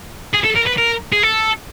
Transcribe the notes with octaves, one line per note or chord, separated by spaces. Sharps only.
G#4
A4
A#4
B4
A#4
G#4
A4